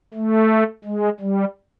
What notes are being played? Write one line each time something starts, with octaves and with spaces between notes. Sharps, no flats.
A3
G#3
G3